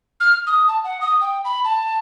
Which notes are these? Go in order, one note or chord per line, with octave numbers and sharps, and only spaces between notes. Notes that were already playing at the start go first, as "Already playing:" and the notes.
F6
D#6
A5
F#5
D#6
G5
B5
A5